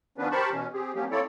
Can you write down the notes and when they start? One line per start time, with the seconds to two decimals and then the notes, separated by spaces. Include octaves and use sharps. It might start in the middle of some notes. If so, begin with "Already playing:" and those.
0.18 D#3 F3 B3 C#4 D4 B4
0.31 G4 A#4 C5 A5 B5 C#6
0.52 B2 E3 C#4
0.73 C4 G4 G#4
0.95 F3 F#3 A#3 C4 C#4 G4
1.11 A#3 C4 E4 A4 C#5 D5